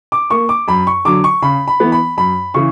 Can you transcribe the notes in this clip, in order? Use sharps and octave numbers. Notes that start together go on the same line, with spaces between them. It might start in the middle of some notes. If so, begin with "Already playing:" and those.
D6
A#3 C#6
D6
F#2 B5
C#6
D3 F#3 D6
C#6
C#3 B5
B5
E3 B3
B5
F#2 B5
C#3 E3 C#6